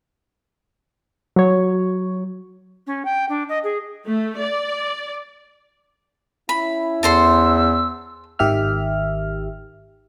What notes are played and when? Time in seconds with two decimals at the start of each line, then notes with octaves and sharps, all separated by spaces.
1.36 F#3 C#5
2.86 C#4
3.05 G5
3.29 D4
3.49 D#5
3.63 G#4
4.05 A3
4.38 D5
6.49 C#4 E4 B5
7.03 E2 A4 C5 C6 E6
8.39 G#1 D#3 G4 E5 F6